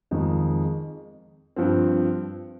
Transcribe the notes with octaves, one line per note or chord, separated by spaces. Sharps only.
F2 D#3 G#3
G2 F3 C4